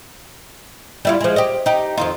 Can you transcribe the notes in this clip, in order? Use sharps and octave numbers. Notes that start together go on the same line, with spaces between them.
G3 E4 F4
F3 G#3
G4 D#5
D#4 G4
F2 D#3 F4